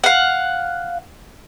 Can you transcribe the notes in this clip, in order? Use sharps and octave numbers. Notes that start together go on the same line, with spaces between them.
F5 F#5